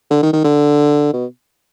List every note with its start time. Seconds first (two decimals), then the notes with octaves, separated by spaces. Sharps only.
0.10 D3
0.22 D#3
0.33 D#3
0.44 D3
1.13 B2